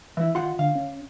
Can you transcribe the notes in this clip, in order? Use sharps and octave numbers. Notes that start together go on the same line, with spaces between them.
E3 E4 E5
D#3 F4 F#5 C6
D3 F5
C#4